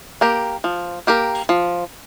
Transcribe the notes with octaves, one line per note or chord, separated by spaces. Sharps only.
A#3 G4 A#4
F3
A#3 G4 A#4
F3